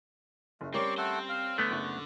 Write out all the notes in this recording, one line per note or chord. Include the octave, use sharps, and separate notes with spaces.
F#1 A3
G3 C4 C#4 A#4 D5 C6 C#6
A3 C4 A4 C5 F#5
F5
D3 A3 B3
F#1 F#4